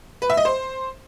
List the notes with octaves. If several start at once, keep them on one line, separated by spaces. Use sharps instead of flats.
B4
E5
D#5
C5